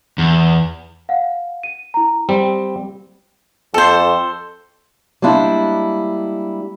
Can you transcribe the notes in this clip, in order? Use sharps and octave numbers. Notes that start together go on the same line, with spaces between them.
E2
F5 F#5
D#7
E4 A#5
G3 C4 G5
F2 A4 C5
G3 G#3 A#3 D4 E4